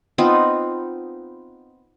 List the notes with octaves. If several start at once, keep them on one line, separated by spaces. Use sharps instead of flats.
B3 C4 D#4 F4